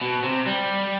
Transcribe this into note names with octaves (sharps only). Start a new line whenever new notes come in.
B2
C3
G3